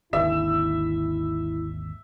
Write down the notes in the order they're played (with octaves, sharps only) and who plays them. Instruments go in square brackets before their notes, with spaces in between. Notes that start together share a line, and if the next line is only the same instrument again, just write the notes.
[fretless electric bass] G#1 D#2 D3 [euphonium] E4 [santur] E5